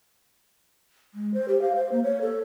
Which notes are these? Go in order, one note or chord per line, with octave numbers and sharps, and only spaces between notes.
G#3
C5
G4
F5
C5
A#3
C#5
A4